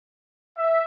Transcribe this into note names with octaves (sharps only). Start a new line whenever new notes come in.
E5